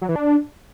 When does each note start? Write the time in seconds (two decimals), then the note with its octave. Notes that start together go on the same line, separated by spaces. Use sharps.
0.02 F#3
0.09 E3
0.16 D4